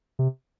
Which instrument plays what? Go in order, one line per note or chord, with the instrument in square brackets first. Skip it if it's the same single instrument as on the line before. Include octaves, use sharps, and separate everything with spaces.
[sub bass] C3